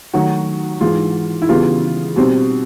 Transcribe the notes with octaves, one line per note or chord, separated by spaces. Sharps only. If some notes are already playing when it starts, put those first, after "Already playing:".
D#3 F#3 A3 F#4
G#2 E3 G#3 F4
E4
C#3 E3 G3 B3 F4
B2 G3 C4